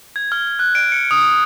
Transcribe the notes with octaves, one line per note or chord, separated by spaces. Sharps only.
G#6
F6
F#6
D7
C#7
D#6